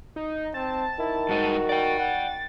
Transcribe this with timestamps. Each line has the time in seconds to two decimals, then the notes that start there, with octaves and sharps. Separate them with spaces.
0.16 D#4
0.54 C4 A5
0.99 D#3 E4
1.29 G2 G#3 D#4 F#4
1.69 D5 G5 A6
1.99 F#5